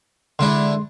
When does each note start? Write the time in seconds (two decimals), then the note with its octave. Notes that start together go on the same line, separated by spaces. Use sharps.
0.39 D3 G#3 D4 E4 C6